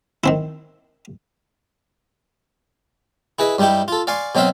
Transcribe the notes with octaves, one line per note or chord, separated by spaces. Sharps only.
D#3 C4 E4
E4 G#4 B4 D#5
G2 G3 D#4 E4 G4
F4 A4
D5 F5 G#5 C6 C#6
B2 F#3 C4 D#4 E5 F5